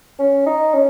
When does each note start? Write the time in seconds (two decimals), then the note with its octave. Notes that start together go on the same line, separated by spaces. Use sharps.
0.19 C#4
0.46 D#4
0.74 C#4